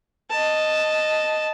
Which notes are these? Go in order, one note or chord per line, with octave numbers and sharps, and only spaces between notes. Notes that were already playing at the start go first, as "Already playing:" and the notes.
D#5 A5